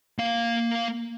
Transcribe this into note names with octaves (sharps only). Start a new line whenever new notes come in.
A#3 F5